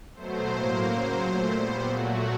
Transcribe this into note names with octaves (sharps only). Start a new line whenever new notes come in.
B2 F#3 A3 C5
A2 F#3 A#3
C#3 F#3 A#3 C5
A#2 F#3 A3
A#2 G3 B3
A#2 F#3 A3 F#4